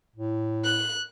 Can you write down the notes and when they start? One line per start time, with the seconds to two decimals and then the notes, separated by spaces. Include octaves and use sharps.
0.16 A2
0.64 F#6